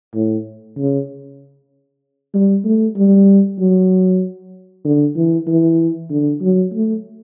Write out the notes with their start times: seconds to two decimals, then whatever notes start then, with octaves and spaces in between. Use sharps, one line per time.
0.15 A2
0.78 C#3
2.34 G3
2.65 A3
2.96 G3
3.59 F#3
4.85 D3
5.16 E3
5.47 E3
6.10 D3
6.42 F#3
6.73 A3